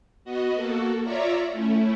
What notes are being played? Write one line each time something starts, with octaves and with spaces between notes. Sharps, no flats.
B3 F#4 D#5
A#3 F#4 A4
F4 C#5 D5 E5 A#5
A3 C#4 E4